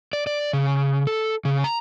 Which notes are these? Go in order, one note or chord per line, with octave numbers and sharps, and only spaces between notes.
D5
D5
C#3
A4
C#3
A#5